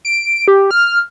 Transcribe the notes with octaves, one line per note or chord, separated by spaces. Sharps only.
D7
G4
F6